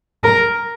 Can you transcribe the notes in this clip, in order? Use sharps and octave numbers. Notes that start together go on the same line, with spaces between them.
A#4